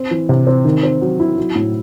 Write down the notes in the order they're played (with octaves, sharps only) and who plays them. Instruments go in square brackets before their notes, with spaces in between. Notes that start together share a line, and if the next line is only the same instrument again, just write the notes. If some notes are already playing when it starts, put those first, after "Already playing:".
Already playing: [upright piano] C4
E3
C3
C4
D#3
C4
F#3
E4
F#3
A2